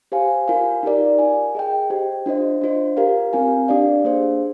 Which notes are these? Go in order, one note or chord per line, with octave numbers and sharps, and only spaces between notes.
G4 C5 F5 G#5
F4 A#4 F5 G#5
D#4 G4 A#4 D5
F4 A#4 F5 G#5
G#4 D#5 G5
G4 C5 G5
D4 F4 C5 D#5
D4 F4 C5
G4 A#4 F5
C4 F4 A#4 F5 G#5
D4 G4 D5 F5
A#3 D4 G#4 C5 F5